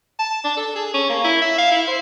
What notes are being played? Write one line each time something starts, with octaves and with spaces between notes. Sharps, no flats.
A5
D4
A4
G#4
C#4
A#3
E4
E5
F5
E4
C5